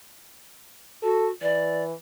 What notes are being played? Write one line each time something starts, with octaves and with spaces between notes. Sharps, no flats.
F#4 A4
E3 D5